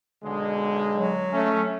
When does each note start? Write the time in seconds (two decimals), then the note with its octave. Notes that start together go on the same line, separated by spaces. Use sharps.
0.23 B1 D3 G#3
0.93 F#3
1.33 A3 C#4